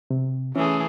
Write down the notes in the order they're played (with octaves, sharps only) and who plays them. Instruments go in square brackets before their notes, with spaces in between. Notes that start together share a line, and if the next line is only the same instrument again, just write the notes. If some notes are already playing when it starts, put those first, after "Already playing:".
[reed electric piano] C3
[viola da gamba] E3 A3 G#4 [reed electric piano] C#4